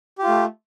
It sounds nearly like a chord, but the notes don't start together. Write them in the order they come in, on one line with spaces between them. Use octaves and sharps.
G4 F4 A3